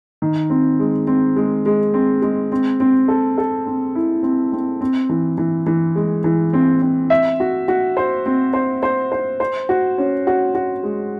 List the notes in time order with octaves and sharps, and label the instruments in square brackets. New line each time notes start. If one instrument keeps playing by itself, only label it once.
[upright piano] D#3
C4
G#3
C4
G#3
G#3
C4
G#3
C4
C4
A4
A4
C4
E4
C4
C4
C4
E3
E3
E3
G#3
E3
C4
C4
E5
F#4
F#4
C5
C4
C5
C5
C5
C5
F#4
C#4
F#4
F#4
G#3